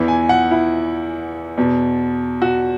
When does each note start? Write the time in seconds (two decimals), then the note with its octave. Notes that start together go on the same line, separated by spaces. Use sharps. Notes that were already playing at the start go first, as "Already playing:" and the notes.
Already playing: E2 E3
0.08 G#5
0.29 F#5
0.51 E4
1.57 E2 B2
2.42 F#4